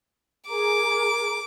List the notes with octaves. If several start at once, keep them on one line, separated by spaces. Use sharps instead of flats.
G#4 A#4 A#5 D6